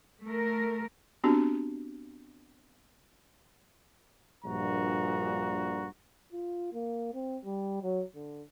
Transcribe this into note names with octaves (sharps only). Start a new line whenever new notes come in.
A3 A#4
B3 C4 D4 F#4 G4
A#1 G2 A#2 F#4 A#5
F4
A#3
C4
G3
F#3
D3